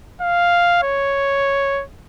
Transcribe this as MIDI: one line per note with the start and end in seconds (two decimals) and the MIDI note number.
0.21 0.83 77
0.83 1.83 73